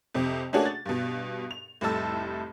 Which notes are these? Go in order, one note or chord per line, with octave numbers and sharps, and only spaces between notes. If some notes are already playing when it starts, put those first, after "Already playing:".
F2 C3
A3 A#3 C#4 D4 F#4 G#4
A6
G2 B2
F7
F1 A2 G3 A4 A5 E6